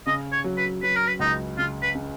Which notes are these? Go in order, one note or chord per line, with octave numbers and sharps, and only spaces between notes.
C#3 D#5
C#5
F#3
B4
F#3 B4
A#4
B4
C#2 D#4
C#3 F4
B4
C#3